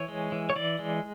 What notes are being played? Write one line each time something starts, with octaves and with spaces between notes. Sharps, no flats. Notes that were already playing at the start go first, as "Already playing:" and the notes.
Already playing: E3 C#5
G#3
E3
C#5
E3 D5
G#3